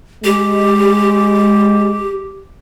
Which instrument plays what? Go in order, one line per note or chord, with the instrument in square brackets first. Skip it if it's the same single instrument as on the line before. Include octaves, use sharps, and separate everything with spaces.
[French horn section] G#3 [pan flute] G4